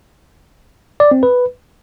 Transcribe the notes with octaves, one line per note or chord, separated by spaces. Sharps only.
D5
C4
B4